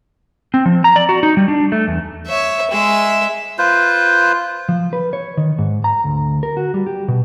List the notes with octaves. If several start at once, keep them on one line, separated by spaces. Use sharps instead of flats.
C4
F3
A#5
D5
F#4
D#4
G3
D4
A3
E2
C#5 E5
G#3 E5
F4 B4 C5
F3
B4
C#5
D#3
G#2
A#5
D2
A#4
F#4
G3
G4
B2